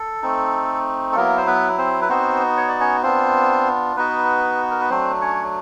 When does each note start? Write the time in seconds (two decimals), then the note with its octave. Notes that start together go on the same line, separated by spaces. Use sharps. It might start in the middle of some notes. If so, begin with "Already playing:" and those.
Already playing: A4
0.22 A3 C4 D#4
1.12 A4
1.15 F#3 A#3 B3 E4 A#4
1.38 C5
1.47 B3 B4
1.78 C4 C5
2.02 B4
2.09 B3 C4 D#4 F#4 C5
2.57 C#5
2.68 D5
2.80 C#4 C#5
3.03 B3 C4 D4 F4 C5
3.96 B3 D#4 F#4 B4
4.71 A#4
4.80 B4
4.90 F#3 A3 C4 D4 C5
5.21 C#4 C#5